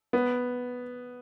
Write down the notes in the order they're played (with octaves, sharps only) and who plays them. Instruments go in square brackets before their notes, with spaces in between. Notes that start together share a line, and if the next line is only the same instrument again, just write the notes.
[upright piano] B3